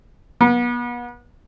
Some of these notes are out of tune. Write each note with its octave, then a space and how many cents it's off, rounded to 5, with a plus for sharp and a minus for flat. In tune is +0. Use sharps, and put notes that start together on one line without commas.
B3 -35